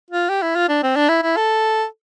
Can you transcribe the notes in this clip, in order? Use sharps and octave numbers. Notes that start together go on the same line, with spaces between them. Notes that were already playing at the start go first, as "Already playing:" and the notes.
F4
G4
E4
F4
D4
C4
D4
E4
E4
A4